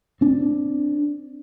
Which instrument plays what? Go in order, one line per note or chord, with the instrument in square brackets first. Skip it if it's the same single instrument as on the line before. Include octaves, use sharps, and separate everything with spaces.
[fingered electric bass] C4 D4